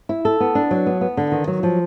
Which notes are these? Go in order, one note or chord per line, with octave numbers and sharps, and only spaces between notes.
E4
A4
B3
D4
F#3
B3
B3
D3
D#3
F#3
F3